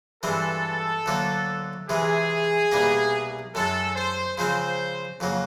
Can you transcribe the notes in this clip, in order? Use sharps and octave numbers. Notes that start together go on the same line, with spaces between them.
G2 E3 G#3 C4 A4
D2 D3 F#3 A#3
C3 E3 G#3 G#4
C2 B2 G3 A#3 D#4
F#2 D#3 G#3 A4
C5
C#3 F3 G#3 C4 C5
F2 C#3 F#3 A#3